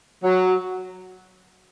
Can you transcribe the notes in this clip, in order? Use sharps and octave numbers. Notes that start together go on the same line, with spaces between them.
F#3